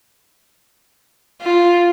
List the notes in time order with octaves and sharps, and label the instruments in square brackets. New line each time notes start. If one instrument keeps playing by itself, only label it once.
[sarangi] F4